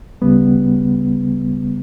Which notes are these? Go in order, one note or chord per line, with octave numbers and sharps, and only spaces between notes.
D2 C#3 G3 B3